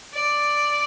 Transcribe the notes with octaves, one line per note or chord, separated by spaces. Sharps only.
D5